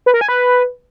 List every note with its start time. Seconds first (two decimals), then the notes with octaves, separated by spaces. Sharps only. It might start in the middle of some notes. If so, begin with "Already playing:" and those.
0.06 B4
0.14 A#4
0.21 G#5
0.29 B4